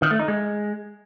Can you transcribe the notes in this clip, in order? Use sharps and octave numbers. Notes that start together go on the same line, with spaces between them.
D#3
A3
D#4
G#3